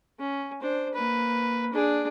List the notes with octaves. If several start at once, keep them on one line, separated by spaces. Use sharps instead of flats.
C#4
D4 C5
A#3 B4
D4 G#4